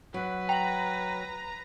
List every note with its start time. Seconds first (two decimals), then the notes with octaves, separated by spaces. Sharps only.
0.14 F#3 B4
0.49 G5 A#5 F#7